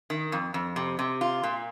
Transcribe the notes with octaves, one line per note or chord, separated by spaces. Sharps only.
D#3
F2
F2
C3
C3
F4
A#2